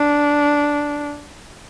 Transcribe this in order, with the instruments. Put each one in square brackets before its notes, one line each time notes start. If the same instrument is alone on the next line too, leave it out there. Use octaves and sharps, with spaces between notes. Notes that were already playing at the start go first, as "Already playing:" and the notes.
Already playing: [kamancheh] D4